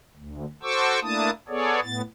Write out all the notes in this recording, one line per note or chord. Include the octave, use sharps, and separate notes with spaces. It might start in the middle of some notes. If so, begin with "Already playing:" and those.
D2
F#4 A4 C5 C#6 D6 E6
A3 A#3 D4 E4 A5 D#6
B3 G#4 A4 C#5 D5
A2 B3 A6